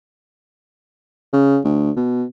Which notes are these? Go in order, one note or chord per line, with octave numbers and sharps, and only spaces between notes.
C#3
D2
B2